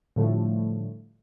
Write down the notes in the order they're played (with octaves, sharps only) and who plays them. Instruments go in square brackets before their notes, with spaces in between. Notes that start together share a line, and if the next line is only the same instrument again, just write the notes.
[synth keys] A2 D3 F3 G3 A3